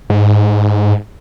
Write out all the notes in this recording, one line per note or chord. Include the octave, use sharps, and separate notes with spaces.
G#2